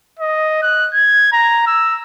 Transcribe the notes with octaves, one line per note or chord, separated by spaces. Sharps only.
D#5
F#6
G#6
A#5
E6